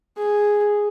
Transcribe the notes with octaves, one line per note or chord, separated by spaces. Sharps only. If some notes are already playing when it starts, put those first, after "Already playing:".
G#4